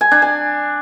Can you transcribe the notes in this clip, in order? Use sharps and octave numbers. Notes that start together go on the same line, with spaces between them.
G#5
D4
G#5